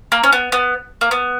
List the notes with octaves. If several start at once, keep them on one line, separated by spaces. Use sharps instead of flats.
A#3
C#4
B3
B3
A#3
B3